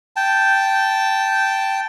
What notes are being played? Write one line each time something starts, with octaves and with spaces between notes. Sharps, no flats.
G5 A5